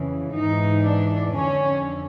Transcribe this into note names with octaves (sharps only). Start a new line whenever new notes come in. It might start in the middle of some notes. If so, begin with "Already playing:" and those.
Already playing: F2 C#3 E3
G#2 E3 D#4
D4
F2 D3 C#4